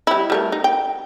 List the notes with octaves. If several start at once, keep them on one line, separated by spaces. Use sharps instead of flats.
G3 E4
G3 A3 A#4
D#4
G5